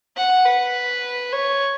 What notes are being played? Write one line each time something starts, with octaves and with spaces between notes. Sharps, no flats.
F#5
B4
C#5